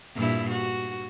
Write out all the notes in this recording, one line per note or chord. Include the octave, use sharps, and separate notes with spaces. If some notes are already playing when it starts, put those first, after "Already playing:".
G2 A#2 E4
F#4